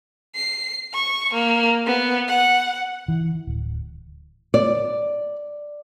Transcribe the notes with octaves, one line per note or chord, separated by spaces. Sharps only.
C7
C#6
A#3
B3
F#5
E3
D1
D5